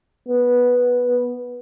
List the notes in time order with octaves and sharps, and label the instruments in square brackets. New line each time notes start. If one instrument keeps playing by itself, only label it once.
[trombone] B3